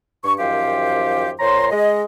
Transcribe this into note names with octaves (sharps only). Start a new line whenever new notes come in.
G2 C#6
F#2 D#3 F3 G4 C5 F5
A#2 C5 C#5 A#5 C6
G#3 D#5